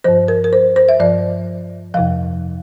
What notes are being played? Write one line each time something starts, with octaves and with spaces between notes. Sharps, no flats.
G2 F3 C5
A#4
A#4
C5
C5
E5
G2 F3 D5
F2 C3 F3 F5